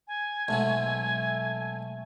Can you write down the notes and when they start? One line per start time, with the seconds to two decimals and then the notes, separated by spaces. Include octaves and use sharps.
0.08 G#5
0.48 B1 G#2 F#3 A3